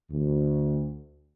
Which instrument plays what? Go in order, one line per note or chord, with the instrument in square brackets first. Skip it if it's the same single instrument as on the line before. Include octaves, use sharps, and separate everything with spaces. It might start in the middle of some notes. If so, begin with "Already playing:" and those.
[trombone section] D2